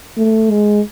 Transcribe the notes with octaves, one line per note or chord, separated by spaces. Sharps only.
A3
G#3